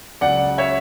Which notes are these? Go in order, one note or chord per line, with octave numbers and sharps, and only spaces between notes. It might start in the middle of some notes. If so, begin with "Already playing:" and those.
C#2 C#3 F#3 D5 F#5
C#5 E5